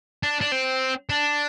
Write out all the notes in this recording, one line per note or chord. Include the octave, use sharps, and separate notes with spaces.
D4
D4
C4
D4